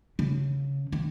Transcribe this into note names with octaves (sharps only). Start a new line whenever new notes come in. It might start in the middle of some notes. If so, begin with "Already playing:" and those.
C#3
D#3